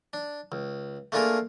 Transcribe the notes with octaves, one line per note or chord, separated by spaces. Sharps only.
D4
C#2
A3 A#3 D4 F4 G#4 A#4